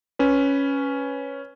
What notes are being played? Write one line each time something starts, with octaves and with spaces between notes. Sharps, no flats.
C#4 B4